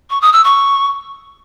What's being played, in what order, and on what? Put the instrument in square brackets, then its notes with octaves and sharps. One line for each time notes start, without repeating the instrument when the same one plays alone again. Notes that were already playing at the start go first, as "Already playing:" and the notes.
[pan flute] C#6
D#6
E6
C#6